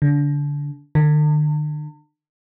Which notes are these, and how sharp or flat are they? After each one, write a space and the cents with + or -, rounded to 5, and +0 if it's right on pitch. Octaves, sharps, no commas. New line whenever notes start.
D3 -25
D3 +45